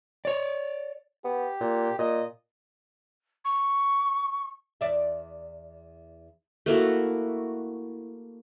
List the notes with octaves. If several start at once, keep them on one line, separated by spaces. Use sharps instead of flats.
C#5 D5
B3 G4
A#2
A#2 D#5
C#6
E2 D5 E5
A3 A#3 E4 F#4